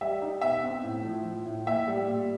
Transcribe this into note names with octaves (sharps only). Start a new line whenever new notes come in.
G3 E5
D#4
B2 E5
C4
A2
F3
F3
A2
A#2 E5
G3
A#2